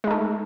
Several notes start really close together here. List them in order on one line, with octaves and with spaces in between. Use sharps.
G#3 D#4 A3